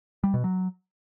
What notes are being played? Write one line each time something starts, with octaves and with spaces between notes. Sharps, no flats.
G3
B2
F#3